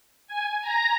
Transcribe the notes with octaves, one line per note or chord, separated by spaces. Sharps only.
G#5
A#5